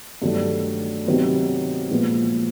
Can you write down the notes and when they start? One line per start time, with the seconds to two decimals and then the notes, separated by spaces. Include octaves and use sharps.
0.22 G2 D#3 F#3 A3 D4
1.06 C3 D#3 F#3 B3
1.90 A#2 F3 G#3 B3